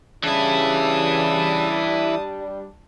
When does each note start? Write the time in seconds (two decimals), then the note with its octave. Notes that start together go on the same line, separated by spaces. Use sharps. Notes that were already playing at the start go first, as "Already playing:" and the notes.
0.24 C#3 E3 G3 D4 E4 A5 D#6